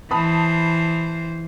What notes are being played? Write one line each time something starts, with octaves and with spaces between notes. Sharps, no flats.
E3 C5 A5 B5 D#6